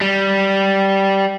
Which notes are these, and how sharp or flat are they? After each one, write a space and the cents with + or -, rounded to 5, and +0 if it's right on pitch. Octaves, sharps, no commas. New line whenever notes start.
G3 -10